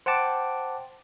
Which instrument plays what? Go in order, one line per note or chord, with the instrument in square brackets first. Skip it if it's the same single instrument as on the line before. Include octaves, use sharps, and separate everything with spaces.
[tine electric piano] C5 F#5 G5 A5 D6